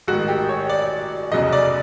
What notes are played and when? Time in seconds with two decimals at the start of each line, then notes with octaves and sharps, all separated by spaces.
0.08 A1 G#2 D#3 F#4
0.28 G4
0.49 C#5
0.69 D5
1.32 F1 E2 C#3 F#3 D#5
1.53 D5